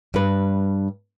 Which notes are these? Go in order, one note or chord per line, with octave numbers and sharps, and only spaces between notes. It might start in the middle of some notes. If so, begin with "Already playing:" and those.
G2 B4